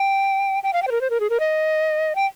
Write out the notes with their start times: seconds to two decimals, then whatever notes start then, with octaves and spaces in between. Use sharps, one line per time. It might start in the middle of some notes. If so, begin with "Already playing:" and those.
Already playing: G5
0.63 G5
0.73 F5
0.82 G5
0.87 C5
0.91 A#4
1.01 C5
1.10 A#4
1.20 G#4
1.30 A#4
1.40 D#5
2.15 G5